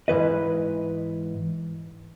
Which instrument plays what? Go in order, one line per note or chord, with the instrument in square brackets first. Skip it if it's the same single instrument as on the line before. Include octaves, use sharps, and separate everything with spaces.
[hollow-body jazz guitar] G#2 E3 B4 D#5